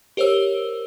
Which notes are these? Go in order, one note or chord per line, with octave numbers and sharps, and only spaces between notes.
G4 A#4 C5 C#5 E6